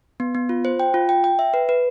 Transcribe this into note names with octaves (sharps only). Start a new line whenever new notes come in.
B3
B3
F4
C5
G5
F4
G5
G5
E5
B4
B4